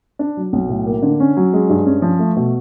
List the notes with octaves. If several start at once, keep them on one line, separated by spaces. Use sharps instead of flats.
D4
F#3
B1
A2
A#3
D3
C#4
F#3
G#3
G2
C#4
F3
A3
B2